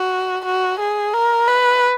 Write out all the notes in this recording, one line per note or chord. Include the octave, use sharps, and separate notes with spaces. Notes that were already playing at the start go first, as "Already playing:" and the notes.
Already playing: F#4
F#4
G#4
A#4
B4